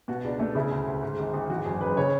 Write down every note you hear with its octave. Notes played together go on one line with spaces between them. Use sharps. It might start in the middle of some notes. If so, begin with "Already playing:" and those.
B2 F#4
C#2 D4
B2 A3
C#3 E4
D2
D2
G#2
G#1
G#1
E2 F#4
F#1 G#4
F#1 B4
C#3 C#5